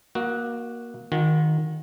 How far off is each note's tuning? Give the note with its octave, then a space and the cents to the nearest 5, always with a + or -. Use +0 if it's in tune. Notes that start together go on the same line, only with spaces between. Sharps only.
A#3 +15 F#4 -5 D#5 +40
D#3 +0 F#4 -40